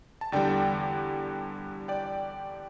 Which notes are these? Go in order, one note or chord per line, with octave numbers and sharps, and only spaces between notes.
A5
E2 D3 G3 D5 G5
D5 G5